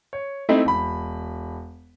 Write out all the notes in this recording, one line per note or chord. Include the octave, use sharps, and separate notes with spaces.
C#5
A3 C4 D#4 E4
E1 B5